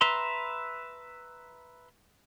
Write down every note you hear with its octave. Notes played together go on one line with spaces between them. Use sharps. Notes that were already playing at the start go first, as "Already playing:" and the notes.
B4 E5 A#5 C6